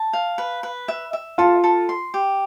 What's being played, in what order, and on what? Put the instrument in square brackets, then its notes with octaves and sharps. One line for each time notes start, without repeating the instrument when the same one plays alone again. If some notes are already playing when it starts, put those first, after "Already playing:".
Already playing: [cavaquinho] A5
F5
B4
B4
E5
E5
[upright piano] F4 [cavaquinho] A4
[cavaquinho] A4
C6
G4